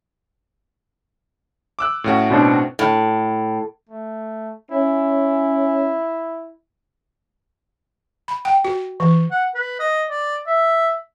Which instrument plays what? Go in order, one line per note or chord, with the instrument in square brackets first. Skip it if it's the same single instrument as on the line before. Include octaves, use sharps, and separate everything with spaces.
[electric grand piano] D6 E6 F#6
A2 C#4 F#4
[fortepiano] B2 C4 D4
[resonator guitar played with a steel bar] A2
[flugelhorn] A3
[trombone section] C#4 [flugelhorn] E4
[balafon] B5
G5
F#4
E3
[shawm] F#5
B4
D#5
D5
E5